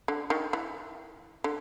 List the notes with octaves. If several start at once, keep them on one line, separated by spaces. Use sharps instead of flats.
D3
D#3
E3
D3